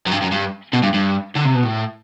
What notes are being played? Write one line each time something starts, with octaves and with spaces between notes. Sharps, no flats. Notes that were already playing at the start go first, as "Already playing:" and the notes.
F#2
G2
F#2
G2
B2
G2
G2
D3
C3
B2
A2